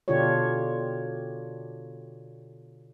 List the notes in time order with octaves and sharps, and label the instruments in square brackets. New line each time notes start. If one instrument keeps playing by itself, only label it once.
[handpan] B2 D3 D4 F4 G4 C#5